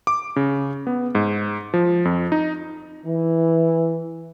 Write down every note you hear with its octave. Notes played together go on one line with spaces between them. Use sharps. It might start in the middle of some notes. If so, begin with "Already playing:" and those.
D6
C#3
B3
G#2
F3
F2
D#4
E3